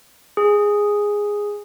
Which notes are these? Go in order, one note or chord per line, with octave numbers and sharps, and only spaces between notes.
G#4